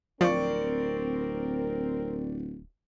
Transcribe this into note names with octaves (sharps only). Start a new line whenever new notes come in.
D1 F3 C4 A#4 D5 C#6